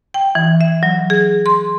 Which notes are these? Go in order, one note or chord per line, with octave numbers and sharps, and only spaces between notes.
G5
E3
E5
F#3
G#4
C6